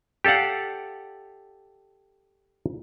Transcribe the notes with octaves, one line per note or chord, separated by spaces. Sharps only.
G4 A4 D5 F5 F#5